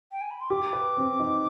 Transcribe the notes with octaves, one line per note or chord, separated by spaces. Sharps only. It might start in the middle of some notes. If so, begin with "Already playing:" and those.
G5
G#5
B5
C6
G4 D6
B4
C4
D#4